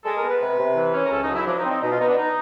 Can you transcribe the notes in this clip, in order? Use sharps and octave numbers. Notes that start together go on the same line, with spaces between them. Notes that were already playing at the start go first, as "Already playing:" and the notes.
G#3 A4
A#4
B3
B4
C3
C3
E3
C#4
A#4
C#2 A4
D#4
F#3
E4
F3 D4
D#4
C4
D#4
B2 D#4
F4
B3 D#4
D4
D#4